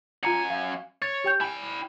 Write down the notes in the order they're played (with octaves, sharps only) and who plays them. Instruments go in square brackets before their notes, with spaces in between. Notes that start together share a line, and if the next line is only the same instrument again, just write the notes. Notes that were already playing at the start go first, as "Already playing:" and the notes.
[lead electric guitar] F#2 G#5 [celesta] F4 A#5 C#7
[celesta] F5
[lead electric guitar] C#5 [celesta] A6
[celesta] G4 G5 G6
[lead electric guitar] E4 G5 [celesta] G#5